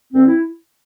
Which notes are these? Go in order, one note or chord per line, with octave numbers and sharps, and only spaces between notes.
D2 C4
E4